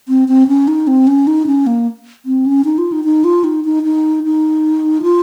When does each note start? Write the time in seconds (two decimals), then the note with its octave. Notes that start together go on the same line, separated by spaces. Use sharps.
0.08 C4
0.28 C4
0.48 C#4
0.68 D#4
0.87 C4
1.07 C#4
1.27 D#4
1.47 C#4
1.67 A#3
2.26 C4
2.46 C#4
2.65 D#4
2.78 F4
2.92 D#4
3.04 D#4
3.24 F4
3.44 D#4
3.65 D#4
3.84 D#4
4.24 D#4
5.02 F4